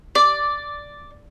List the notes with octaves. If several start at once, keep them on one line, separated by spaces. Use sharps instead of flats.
D5